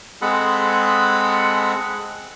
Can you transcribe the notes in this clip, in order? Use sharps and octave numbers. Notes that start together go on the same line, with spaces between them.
G#3 C4 G#4 A4 F#5 B5